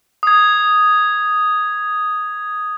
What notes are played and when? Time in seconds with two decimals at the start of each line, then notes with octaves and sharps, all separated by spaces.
0.23 D#6 G#6